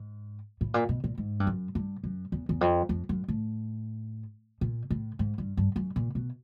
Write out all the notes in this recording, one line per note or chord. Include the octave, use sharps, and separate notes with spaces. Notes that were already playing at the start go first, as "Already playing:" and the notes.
Already playing: G#2
A2
A#2
B2
A#2
G#2
G2
F#2
G2
F#2
E2
E2
F2
F2
F#2
A2
A#2
A2
G#2
G2
G2
F#2
A#2
B2